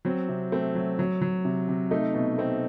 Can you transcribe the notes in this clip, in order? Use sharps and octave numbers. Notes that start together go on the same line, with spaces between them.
F#3 C4
C3
A3 C4
F#3
F#3
F#3
C3
C3
A3 D#4
B2
A3 C4